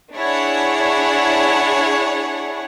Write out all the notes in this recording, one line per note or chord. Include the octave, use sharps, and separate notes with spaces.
D4 E4 G#4 C#5 F#5